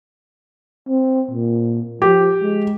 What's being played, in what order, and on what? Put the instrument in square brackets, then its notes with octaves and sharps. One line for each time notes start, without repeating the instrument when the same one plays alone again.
[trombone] C4
A#2
[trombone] F3 [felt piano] G4
[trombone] G#3